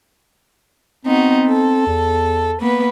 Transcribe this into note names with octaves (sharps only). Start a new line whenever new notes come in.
B3 C4 D#4 F#4
A4
E2
A#3 B3 B4